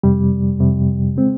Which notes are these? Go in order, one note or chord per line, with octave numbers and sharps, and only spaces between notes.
F2 C3 G3
F2 C3 G3
C#3 G#3 C4